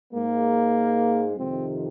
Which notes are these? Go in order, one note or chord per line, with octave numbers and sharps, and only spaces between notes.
G#2 G#3 A#3
F2 C3 D#3 C4